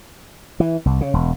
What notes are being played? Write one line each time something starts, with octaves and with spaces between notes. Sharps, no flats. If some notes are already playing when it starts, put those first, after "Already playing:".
E3
C2
C#3
E1